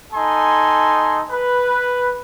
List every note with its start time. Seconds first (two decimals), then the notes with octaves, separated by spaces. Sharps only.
0.13 D#4 A4 G#5 C6
1.31 B4